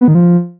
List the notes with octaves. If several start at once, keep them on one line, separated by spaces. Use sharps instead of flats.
B3
D#3
F3